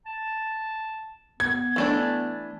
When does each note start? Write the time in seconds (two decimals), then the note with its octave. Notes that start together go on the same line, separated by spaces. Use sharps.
0.07 A5
1.40 B3 G#6
1.76 E3 A3 D4